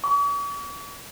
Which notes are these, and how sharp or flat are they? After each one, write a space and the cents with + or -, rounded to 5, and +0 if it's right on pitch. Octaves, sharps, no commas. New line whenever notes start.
C#6 +45